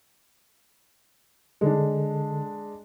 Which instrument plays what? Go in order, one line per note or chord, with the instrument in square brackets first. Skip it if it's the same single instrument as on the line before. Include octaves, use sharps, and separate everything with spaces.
[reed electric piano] D3 A4 [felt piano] G#3 D4